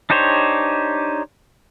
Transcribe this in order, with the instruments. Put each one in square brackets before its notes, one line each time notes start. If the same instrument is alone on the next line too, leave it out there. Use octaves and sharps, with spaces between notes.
[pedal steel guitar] D4 D#4 G4 C5 C#5